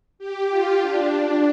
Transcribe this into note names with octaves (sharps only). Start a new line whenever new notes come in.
G4
F4
D4